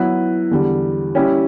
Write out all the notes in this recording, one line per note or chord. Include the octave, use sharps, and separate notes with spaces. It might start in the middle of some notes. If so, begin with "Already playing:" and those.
Already playing: F#3 B3 E4 B4
E2 D3 G3
G3 C#4 E4 G4